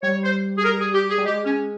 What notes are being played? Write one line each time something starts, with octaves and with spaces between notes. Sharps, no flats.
G3 C#5
C5
G#4
A#4
G#4
G4
G#4
G3
G#3 G4
C#4